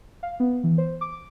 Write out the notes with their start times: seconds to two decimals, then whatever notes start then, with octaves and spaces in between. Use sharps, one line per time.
0.23 F5
0.40 B3
0.64 E3
0.78 C5
1.01 D6